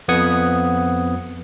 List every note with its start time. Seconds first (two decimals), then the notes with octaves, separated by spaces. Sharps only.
0.08 F2 B3 F#5 D#6 G#6 C#7